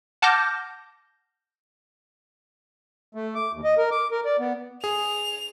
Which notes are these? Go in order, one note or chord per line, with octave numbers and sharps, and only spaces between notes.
F#5 A5 D6 F6 G6 A#6
A3
D6
D#2
D#5
A#4
D6
A#4
D5
B3
G#4 F7